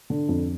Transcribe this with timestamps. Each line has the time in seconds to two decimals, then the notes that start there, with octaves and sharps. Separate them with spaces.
0.10 D3
0.29 F2